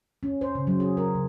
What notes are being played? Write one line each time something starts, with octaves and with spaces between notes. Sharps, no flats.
C#4
C5
C#3
F#3
G#4
A#4
C#3